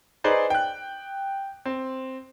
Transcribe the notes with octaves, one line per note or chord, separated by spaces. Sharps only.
D#4 G#4 B4 C5 D5
G5 F#6
C4